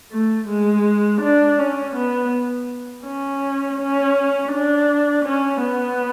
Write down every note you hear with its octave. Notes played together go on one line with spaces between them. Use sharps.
A3
G#3
D4
C#4
B3
C#4
C#4
D4
C#4
B3